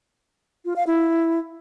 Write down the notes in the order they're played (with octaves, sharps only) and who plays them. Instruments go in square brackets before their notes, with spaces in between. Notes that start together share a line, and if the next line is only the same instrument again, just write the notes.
[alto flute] F4
F5
E4